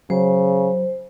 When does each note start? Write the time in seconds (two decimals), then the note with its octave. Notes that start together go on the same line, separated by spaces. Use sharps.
0.10 C#3 F#3 C5